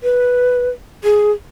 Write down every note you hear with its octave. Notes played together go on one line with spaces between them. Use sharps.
B4
G#4